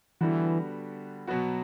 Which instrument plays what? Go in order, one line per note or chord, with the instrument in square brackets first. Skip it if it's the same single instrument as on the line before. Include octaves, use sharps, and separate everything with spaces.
[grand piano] D3 G3 B3 F#4 [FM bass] E3
[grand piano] B2 F#3 B3 F#4